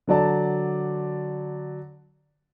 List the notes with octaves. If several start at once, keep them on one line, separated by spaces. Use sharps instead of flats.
D3 F#3 D5 A5